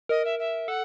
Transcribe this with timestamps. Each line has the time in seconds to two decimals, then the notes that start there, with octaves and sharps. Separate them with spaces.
0.09 A#4 D#5
0.25 E5
0.39 E5
0.68 A4 F#5